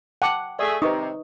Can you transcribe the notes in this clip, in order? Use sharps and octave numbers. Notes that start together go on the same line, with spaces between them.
F#5 G5 A5 D6
A3 G#4 D5
C3 D#4 B4 C#6 D#6